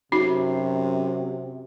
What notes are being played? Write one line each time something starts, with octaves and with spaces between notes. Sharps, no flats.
F#2 C3 D#4 F#4